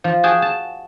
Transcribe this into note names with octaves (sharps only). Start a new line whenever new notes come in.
F3
F#4 G#4 G5 A5
A5